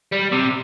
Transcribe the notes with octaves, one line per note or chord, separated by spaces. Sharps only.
G3
C3